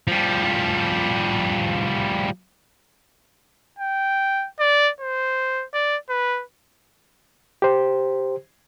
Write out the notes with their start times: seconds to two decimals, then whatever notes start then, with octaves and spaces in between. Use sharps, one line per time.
0.07 F3 G3
3.79 G5
4.60 D5
5.01 C5
5.74 D5
6.09 B4
7.62 G4 C5